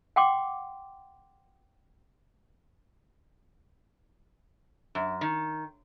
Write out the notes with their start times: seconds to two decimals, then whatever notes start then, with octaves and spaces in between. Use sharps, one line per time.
0.16 F#5 G5 C6 D6
4.95 F#2
5.21 D#3